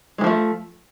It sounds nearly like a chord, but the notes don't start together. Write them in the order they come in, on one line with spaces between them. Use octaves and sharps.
G#3 E3 F3 A3